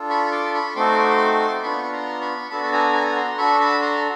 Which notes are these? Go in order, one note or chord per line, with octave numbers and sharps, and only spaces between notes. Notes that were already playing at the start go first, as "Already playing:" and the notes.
Already playing: D4 F4 A4
B5 C#6
C6 D6
B5 C#6
A3 C4 D#4 F#4 A4 C6 D6
B3 D4 F4 B5 C#6
C#6
A#5 C6
B5 C#6
B3 D4 F#4 A4 A5 B5
A5
G#5 A#5
G#5 A#5
A#5 C6
D4 F#4 A4 B5 C#6
A5 B5
A#5 C6